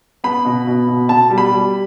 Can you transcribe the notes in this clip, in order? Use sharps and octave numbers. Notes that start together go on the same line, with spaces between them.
B3 B5
B2
B2
B2
B2 A5
G3
B5
G3